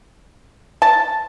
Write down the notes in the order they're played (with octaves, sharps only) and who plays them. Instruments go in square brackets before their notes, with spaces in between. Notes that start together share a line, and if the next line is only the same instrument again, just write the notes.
[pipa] A5